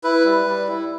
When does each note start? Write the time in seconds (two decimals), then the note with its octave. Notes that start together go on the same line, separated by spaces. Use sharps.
0.04 E4 B4
0.25 G3
0.46 G3
0.68 E4